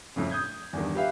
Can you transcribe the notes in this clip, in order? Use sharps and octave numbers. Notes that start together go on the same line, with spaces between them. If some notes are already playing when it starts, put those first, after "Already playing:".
F2 A2 C#3
D#6 G6 G#6
E2 G2 D#3
G4 B4 E5 F5